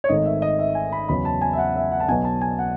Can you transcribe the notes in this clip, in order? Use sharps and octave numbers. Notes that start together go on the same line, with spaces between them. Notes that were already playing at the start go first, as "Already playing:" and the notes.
C#5
G#1 G#2 D#3 A3 D#5
E5
D#5
E5
G#5
B5
E2 C#3 F#3 B5
A5
G#5
E5
F#5
E5
F#5
A5
B1 B2 F#3 B3 G#5
A5
G#5
F#5